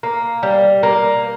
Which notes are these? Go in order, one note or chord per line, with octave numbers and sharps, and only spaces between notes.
A#3
G3
A#3